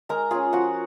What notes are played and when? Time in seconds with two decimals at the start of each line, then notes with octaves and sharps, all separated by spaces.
0.09 G#3 A#4 A#5
0.31 C#4 F4 G#4 G#5
0.53 F3 F#4 F#5